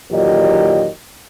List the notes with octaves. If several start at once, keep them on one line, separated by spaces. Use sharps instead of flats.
E2 A#2 D#3 F#3 G4 D#5